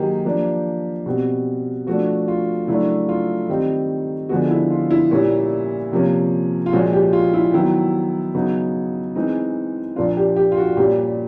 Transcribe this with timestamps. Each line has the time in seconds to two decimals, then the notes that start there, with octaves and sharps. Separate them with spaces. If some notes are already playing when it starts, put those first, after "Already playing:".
Already playing: D#3 F#3 A#3 D#4 G4 G#4
0.25 F3 A#3 D4
1.06 B2 G3 C4
1.87 F3 A3 D4 F#4
2.28 F4
2.68 C#3 F#3 A3 D4 E4
3.09 F4
3.49 D#3 G3 C4 D#4
4.29 D3 F3 G#3 B3 F#4
4.50 E4
4.70 F4
4.91 E4
5.11 A#2 G3 A#3 C#4
5.92 C3 F3 A#3 C#4
6.66 F4
6.73 A#2 F3 G#3 C#4 F#4
6.93 G4
7.13 F4
7.33 E4
7.53 D#3 F#3 B3 E4
8.35 C#3 F#3 B3 D#4
9.16 E3 G#3 C4 D#4
9.96 A#2 F3 A#3 D4 F4
10.17 G4
10.36 G4
10.52 F4
10.57 F#4
10.77 A#2 G3 A#3 C#4 G4